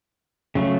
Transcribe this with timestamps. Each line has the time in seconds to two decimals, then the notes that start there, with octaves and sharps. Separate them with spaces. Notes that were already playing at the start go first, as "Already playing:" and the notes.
0.55 C#3 F#3 A3